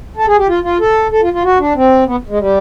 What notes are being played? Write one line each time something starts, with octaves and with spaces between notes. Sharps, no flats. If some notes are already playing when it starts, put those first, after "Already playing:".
A4
G#4
G4
F4
F4
A4
A4
F4
F4
F#4
D4
C4
B3
G#3
G3